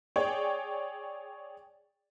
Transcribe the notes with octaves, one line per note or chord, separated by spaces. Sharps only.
G#4 C#5 D5 G5